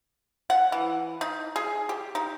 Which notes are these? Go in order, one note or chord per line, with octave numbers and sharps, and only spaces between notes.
F#5
E3
D#4
G#4
G4
D#4